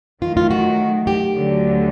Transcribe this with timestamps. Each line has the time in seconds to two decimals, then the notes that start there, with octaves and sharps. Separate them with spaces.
0.22 D#3 F#3 A3 F4
0.37 F4
0.51 F#4
1.07 G4
1.36 D2 D3 F#3 A3